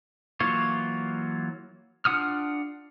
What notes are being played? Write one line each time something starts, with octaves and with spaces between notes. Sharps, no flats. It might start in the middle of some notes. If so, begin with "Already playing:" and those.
E3 F#3 A#3 F4 C#5
D4 F4 F#5 D#6 F6